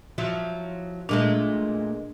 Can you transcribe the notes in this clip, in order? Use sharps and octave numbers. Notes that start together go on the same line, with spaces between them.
F3 F#3 E4
A#2 G#3 A3 D4